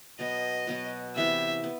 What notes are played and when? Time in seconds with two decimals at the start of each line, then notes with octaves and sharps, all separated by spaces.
0.19 B2 F#3 B3 F#4 D#5
0.67 B2 F#3 B3 F#4
1.16 C3 E3 B3 E5
1.64 B3